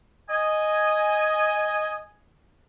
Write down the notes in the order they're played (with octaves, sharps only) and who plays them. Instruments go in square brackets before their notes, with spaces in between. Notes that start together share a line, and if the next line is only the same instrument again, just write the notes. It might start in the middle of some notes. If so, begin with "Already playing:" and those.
[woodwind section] D#5 G#5